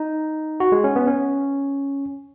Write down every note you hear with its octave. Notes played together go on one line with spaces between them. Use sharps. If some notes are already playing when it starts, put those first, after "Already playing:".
Already playing: D#4
F#4
G#3
C#4
B3
C#4